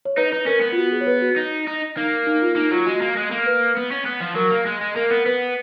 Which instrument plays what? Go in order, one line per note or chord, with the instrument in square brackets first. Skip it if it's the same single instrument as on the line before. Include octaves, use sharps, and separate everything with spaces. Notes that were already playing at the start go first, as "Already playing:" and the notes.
[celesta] C#5
[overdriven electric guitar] D#4 [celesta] B4
[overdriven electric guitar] D#4 [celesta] B4
[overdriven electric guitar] C#4 [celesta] A#4
[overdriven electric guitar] B3
[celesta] F4
F#4
G#4
C#5
B4
F#4
[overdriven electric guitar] D#4
D#4
[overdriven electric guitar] A#3 [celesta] D#4
[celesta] D#4
F4
[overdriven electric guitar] A#3 [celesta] D#4
[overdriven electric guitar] F#3 [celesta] F4
[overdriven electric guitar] G#3 [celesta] F#4
[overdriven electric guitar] A#3
G#3
A#3
[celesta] B4
[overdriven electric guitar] B3
C#4
B3
F3
[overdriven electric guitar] F#3 [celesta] A#4
[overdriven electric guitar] A#3
G#3
G#3
[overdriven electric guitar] A#3 [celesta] A#4
[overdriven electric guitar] B3 [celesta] A#4
[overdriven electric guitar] B3 [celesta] B4